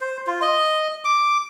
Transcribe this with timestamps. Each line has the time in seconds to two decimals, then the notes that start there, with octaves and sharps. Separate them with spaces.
0.01 C5
0.27 F4
0.42 D#5
1.05 D6